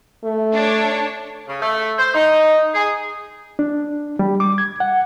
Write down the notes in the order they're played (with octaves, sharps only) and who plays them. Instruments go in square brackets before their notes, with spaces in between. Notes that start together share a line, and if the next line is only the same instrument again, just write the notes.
[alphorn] A3
[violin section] D4 C#5
[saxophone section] C#3
A3
C5
D#4
G#4
[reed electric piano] D4
G3
D6
G#6
F#5